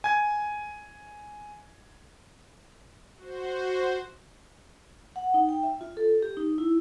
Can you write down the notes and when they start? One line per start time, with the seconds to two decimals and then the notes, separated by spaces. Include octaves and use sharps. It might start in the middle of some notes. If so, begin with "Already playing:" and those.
0.04 G#5 G#6
3.18 F#4 C5
5.16 F#5
5.34 D#4
5.49 G5
5.63 E5
5.81 F4
5.97 A4
6.22 G4
6.37 D#4
6.58 E4